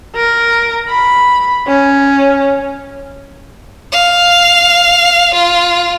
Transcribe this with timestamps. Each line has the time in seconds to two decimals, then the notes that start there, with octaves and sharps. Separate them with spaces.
0.15 A#4
0.89 B5
1.67 C#4
3.93 F5
5.34 F4